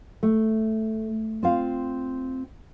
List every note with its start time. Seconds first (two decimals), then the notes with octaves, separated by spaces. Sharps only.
0.23 A3
1.43 C4 F4 F5